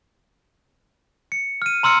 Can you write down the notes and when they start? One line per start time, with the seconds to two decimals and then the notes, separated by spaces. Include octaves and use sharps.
1.32 C#7
1.62 F6 D#7
1.83 A#5 C6 E6 F6 C#7